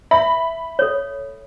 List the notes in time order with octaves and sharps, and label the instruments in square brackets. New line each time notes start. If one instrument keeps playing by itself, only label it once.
[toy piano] E5 [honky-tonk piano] B5
[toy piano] A4 C#5